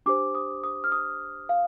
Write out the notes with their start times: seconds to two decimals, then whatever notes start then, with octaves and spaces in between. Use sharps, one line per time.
0.06 D4 G4 C5 D6
0.35 D#6
0.64 D#6
0.84 F6
0.92 D#6
1.49 F5